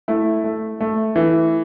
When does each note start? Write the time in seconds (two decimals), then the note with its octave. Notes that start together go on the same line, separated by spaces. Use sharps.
0.08 A3 E4
0.44 A3
0.80 A3
1.16 E3